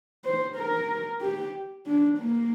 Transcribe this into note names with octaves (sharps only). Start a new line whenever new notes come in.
C5
A#4
G4
D4
A#3